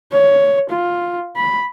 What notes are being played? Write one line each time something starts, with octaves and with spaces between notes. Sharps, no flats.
C#5
F4
B5